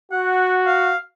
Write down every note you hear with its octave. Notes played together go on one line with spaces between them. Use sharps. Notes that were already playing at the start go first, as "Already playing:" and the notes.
F#4 F#5
F5